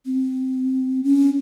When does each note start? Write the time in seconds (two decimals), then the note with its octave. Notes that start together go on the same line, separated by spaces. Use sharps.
0.06 C4
1.04 C#4